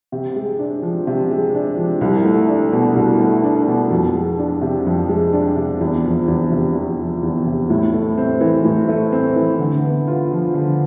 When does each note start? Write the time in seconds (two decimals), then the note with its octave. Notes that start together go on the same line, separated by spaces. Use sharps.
0.12 C3
0.36 G#3
0.59 D4
0.82 F3
1.07 C3
1.31 G#3
1.55 D4
1.77 F3
2.01 C2
2.25 A3
2.49 D4
2.72 B2
2.96 C2
3.20 A3
3.44 D4
3.67 B2
3.91 F2
4.14 G#3
4.38 D4
4.61 C3
4.86 F2
5.09 G#3
5.33 D4
5.57 C3
5.81 E2
6.05 F3
6.28 E2
6.52 C3
6.75 E2
6.99 F3
7.23 E2
7.47 C3
7.70 A2
7.94 A3
8.18 C4
8.41 E3
8.65 A2
8.89 A3
9.12 C4
9.36 E3
9.59 D3
9.84 B3
10.07 F4
10.31 F3
10.54 D3